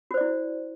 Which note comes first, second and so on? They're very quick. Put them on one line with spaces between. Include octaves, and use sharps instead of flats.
F#4 C5 D5 E4